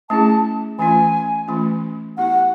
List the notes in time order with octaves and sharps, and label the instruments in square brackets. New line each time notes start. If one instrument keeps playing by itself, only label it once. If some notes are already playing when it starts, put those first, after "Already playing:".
[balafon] A3 C#4 E4 G#4 [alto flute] A5
[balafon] E3 A3 C#4 F4 [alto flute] G#5
[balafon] E3 A3 C#4 F4
[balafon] B3 E4 G4 [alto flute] F#5